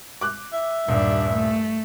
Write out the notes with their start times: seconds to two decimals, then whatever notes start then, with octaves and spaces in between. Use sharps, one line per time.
0.21 D6 F#6
0.53 E5
0.88 D#1 G2 D4
1.33 A3